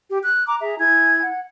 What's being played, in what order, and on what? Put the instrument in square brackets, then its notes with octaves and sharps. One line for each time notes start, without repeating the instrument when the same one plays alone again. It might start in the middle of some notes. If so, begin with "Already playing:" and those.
[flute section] G4
F#6
A#5 D6
G#4 E5 A#5
E4 G#5 G#6
F#5